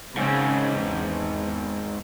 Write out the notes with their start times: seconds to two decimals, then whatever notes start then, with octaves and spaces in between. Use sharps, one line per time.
0.17 G#2 C#3 C4 C#4
0.78 E2